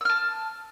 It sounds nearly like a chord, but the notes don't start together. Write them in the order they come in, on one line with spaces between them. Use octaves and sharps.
E6 F6 A5